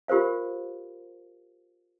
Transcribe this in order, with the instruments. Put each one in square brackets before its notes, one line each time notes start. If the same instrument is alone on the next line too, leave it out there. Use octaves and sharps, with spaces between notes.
[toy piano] F4 G4 A#4 C5 F5